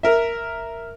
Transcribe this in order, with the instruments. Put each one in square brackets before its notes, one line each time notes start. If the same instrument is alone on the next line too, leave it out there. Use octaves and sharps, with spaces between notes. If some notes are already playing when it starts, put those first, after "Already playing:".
[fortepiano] A#4 E5